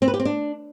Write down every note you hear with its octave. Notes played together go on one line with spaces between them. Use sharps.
C4
B4
G4
C4
D4